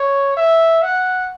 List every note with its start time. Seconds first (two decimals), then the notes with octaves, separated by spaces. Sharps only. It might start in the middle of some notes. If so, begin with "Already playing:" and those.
Already playing: C#5
0.37 E5
0.83 F#5